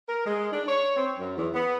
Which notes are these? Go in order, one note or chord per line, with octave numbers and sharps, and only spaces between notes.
A#4
G#3
D4
C#5
C4
F#2
E2
B3